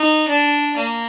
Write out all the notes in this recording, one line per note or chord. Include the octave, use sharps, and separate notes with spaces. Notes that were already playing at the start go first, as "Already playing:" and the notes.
Already playing: D#4
D4
A#3